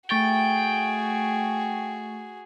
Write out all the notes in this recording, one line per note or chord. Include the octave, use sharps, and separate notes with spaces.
A3 F#4 G#4 G5 C#6 A6